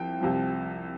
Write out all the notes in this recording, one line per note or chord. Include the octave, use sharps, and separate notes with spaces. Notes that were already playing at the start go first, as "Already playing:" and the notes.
Already playing: C2 F3 G5
C2 C3 F3